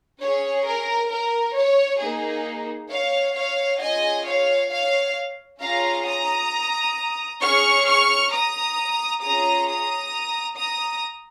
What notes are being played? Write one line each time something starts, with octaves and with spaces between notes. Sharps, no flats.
C#4 G#4 C#5
A#4
A#4
C#5
A#3 D#4 G#4
C#5 F5
C#5 F5
C#4 F4 G#4 D#5 G#5
C#5 F5
C#5 F5
C#4 F4 G#4 F5 A#5
A#5 D#6
C#4 G#4 C#6 F6
C#6 F6
A#5 D#6
C#4 F4 G#4 A#5 D#6
A#5 D#6
A#5 D#6